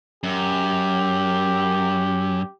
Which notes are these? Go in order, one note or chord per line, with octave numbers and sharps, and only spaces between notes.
F#2 G4